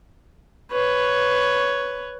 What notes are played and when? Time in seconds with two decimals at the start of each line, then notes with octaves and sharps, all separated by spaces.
0.72 B4 C#5